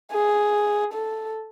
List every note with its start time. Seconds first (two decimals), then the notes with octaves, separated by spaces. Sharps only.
0.12 G#4
0.93 A4